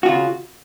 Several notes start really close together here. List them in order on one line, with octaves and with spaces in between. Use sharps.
F#4 F4 C#3